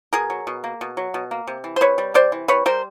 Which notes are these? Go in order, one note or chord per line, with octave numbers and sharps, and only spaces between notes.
B2 G#4 A#4
F#3
B2
A#3
B2
F#3
B2
A#3
C3
E3
C5
C3 B4 C#5
G3
C3 C5 D5
E3
C3 B4 C#5
G3 A#4 C5